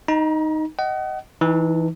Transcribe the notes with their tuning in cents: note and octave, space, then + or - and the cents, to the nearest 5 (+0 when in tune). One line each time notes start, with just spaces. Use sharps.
D#4 +0 A#5 +40
D#5 +0 F#5 +35
E3 +0 D#4 +25 A5 +30